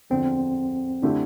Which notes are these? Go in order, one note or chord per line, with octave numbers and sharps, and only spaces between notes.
E2 D3 F3 C4
D3 A3 C4 D4 E4 G4